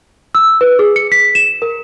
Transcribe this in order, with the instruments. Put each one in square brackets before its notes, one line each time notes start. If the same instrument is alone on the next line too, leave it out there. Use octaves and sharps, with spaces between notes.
[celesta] E6
B4
G#4
C#7
B6
E7
A#4